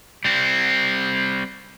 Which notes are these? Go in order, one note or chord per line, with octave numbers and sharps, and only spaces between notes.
G3 C4